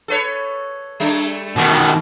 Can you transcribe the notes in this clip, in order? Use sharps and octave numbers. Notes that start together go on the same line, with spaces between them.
A4 B4 C#5
G3 A3 D4
B2 D#3